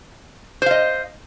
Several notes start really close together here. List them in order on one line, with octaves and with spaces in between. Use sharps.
C5 F5 D#5